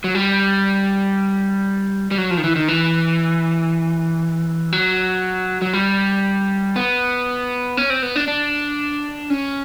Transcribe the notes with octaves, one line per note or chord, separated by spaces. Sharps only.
F#3
G3
G3
F#3
F3
D#3
E3
D#3
E3
F#3
F#3
G3
B3
C#4
C4
B3
D4
D4
C#4